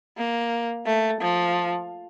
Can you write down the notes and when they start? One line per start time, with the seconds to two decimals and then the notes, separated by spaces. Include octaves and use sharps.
0.18 A#3
0.86 A3
1.21 F3